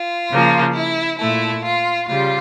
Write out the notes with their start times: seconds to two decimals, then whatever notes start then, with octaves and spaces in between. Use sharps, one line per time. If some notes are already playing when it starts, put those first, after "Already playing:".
Already playing: F4
0.30 C#3 F3 A#3
0.74 E4
1.18 A#2 A3 E4
1.63 F4
2.08 C#3 G3 F4